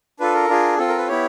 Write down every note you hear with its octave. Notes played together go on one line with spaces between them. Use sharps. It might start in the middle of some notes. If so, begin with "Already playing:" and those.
D4 F4 A4 B4
A#4
D4 F4 G#4
C4 F4 A4
A#4
B4
B3 E4 G4 C#5